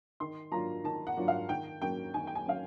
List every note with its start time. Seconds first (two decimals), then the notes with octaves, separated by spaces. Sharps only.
0.20 D#3 C6
0.52 F#3 A#3 D4 F4 A#5
0.84 D#3 A5
1.07 F#5
1.17 F#3 A#3 D4 F4
1.28 F5
1.49 D#3 G5
1.82 F#3 A#3 C#4 G5
2.14 D#3 G#5
2.27 G5
2.35 G#5
2.46 F#3 A#3 C#4 F5